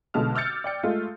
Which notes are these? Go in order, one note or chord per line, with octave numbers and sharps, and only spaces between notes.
B1 B2 D3 G#3 A5 F6
D6 E6 F6 G6 A6 C#7
D5 G5 C#7
G#3 A3 F4